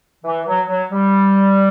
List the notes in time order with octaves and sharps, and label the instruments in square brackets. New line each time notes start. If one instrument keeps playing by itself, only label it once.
[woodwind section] E3
F#3
F#3
G3